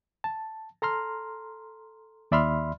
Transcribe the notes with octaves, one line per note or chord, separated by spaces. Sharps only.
A5
A4 A#5 C6 F6
D#2 D5 E5 B5 C6 F6